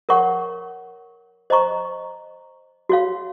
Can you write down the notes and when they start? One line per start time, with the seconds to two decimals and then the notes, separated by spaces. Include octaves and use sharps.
0.09 A#4 C#5 F#5 C#6
1.50 C5 D#5 A#5 C#6
2.89 F#4 C#5 F5